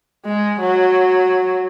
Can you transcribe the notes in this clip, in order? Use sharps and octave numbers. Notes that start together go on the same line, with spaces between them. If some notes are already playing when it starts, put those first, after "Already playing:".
G#3
F#3